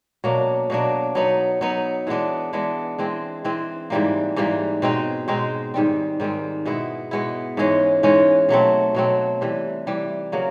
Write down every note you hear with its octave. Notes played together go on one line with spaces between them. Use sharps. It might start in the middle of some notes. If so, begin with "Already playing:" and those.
B2 F#3 A#3 D4
B2 F#3 A#3 D4
F#3 B3 D#4
F#3 B3 D#4
E3 G#3 B3 D4
E3 G#3 B3 D4
E3 G#3 C4
E3 G#3 C4
G#2 E3 G3 A#3
G#2 E3 G3 A#3
B2 G#3 C4 D#4
B2 G#3 C4 D#4
G#2 D#3 G3 C4
G#2 D#3 G3 C4
B2 G#3 B3 E4
B2 G#3 B3 E4
G#2 E3 G#3 C#4
G#2 E3 G#3 C#4
B2 F#3 A3 C4
B2 F#3 A3 C4
C3 E3 G3
C3 E3 G3
C#3 F#3 A#3